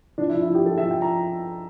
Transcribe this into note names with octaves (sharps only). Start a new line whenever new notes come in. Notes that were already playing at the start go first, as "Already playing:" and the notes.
F3 D4
E4
F3
E4
F3 G4
F3 A4
E5
F3
G5
F3 A#5